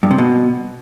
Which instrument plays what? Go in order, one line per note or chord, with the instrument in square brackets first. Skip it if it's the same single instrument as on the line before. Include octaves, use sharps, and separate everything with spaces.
[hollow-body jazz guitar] G2
C3
B2